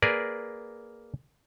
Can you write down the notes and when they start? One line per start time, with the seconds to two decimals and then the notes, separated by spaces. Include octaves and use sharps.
0.02 A#3 G#4 A#4 B4 D5